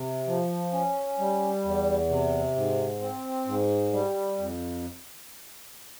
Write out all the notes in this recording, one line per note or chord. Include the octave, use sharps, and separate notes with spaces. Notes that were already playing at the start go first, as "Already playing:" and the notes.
Already playing: C3
F3
C#4
G3
E2
C3
G#2
C4
G#2
G3
F2